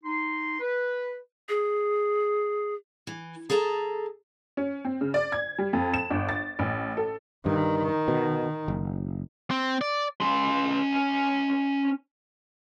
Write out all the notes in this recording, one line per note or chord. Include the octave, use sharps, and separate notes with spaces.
D#4 C6
B4
G#4
E3
G#4 A4 A5 A#5
C#4
C4
C#3
D5
G#6
G3
F2
E7
G1
A6
A1
A4
G2 D#3
B2
F#1
C4
D5
C#4 C6